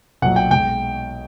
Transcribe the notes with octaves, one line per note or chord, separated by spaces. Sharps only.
B1 A#2 F#3 F#5
G5
B1 B2 G#3 G5